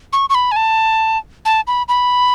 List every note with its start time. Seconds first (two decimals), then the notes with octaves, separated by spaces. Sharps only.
0.13 C#6
0.29 C#6
0.35 B5
0.51 G#5
0.56 A5
1.45 A5
1.67 B5
1.88 B5